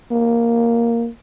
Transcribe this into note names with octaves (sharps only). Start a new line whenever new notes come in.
A#3